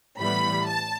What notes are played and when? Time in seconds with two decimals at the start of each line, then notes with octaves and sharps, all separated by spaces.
0.19 A2 E3 G3 B3 B5
0.66 A5